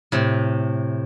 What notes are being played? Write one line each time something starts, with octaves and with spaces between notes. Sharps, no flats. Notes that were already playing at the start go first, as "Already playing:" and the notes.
A2 C3